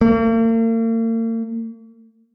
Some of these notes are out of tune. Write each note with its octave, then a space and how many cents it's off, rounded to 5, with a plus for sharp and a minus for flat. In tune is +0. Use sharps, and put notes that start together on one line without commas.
A#3 -45